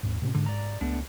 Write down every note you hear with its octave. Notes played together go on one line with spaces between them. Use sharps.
D#2 G#2
A2 C3 C#4
G#2 D3
D5 A#5
C#2 A3 B3 D4